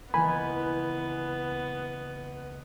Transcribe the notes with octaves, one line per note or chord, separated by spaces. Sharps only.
C#2 E3 A#3 B3 G#5 B5